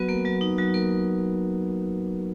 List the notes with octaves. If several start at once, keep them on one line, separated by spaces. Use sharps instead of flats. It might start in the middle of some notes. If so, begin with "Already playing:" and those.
Already playing: F#3 B3 F#4 B4
A#3 A#4
F#3 F#4
D#4
F#3 F#4
A#3 A#4